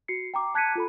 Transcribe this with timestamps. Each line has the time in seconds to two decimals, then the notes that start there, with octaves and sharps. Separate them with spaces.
0.08 F#4 C7 C#7
0.34 G5 A#5 D6
0.55 A5 F#6 G#6 B6 C#7 D#7
0.76 F4 A4 B5